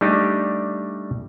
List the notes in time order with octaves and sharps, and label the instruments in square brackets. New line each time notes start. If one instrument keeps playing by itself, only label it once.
[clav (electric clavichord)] G3 A3 D4 D#4 G4